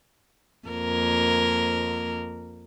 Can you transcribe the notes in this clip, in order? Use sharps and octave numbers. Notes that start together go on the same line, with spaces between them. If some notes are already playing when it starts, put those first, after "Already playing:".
F2 A#3 A#4